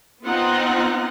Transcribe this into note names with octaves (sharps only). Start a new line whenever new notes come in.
B3 C4 D#4 F4 F#5